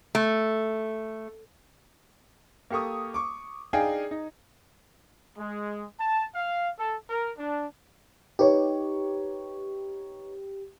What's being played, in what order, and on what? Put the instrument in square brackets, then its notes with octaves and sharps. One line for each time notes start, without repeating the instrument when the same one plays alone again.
[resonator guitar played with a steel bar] A3
[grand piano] A#3 G4 A4 C#6 D#6
C#6 D6
D4 D#4 G#4 F5 G5 G#5
D#4
[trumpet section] G#3
A5
F5
A4
A#4
D4
[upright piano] D#4 B4 C#5 [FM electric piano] G4